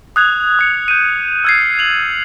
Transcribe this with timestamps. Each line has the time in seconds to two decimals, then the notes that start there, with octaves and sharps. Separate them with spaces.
0.16 D#6 F#6 G#6 F7
0.59 D#6 C#7
0.88 G6 D#7
1.44 E6 F6 G#6 A6 C7
1.79 F7 F#7